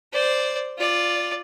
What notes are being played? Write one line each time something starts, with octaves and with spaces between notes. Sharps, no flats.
C5 D5
F4 D5